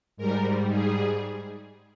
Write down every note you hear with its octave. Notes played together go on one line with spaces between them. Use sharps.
G#2 G3 A#4
G#4